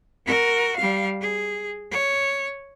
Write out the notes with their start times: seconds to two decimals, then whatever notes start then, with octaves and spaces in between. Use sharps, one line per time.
0.26 F#4 A#4
0.77 G3 F5
1.21 G#4
1.91 C#5